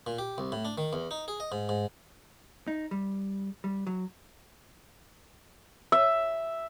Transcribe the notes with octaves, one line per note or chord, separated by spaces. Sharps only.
A#2
G4
C2
A2
D4
D#3
E2
D#4
G#4
D#5
G#2
G#2
D#4
G3
G3
F#3
E5